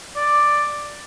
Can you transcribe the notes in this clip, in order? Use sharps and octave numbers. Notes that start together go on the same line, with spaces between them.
D5